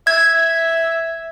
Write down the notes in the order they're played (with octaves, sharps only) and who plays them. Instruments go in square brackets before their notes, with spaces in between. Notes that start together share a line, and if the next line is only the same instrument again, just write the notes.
[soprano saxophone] E5 [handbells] G#6